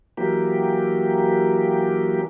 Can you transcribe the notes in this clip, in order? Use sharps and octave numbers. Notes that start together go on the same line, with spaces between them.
E3 F#3 A#3 G4